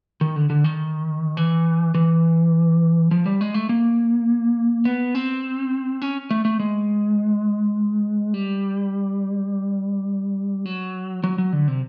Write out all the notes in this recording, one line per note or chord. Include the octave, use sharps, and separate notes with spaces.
D#3
D3
D3
D#3
E3
E3
F3
G3
G#3
A3
A#3
B3
C4
C#4
A3
A3
G#3
G3
F#3
F#3
F#3
D3
C3